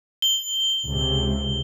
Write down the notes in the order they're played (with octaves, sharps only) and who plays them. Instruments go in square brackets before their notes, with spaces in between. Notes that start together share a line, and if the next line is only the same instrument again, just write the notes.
[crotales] G7
[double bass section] C#2 C3